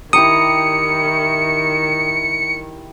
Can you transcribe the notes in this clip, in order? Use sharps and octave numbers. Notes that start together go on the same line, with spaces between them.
D#3 E4 G4 A#5 D#6 C#7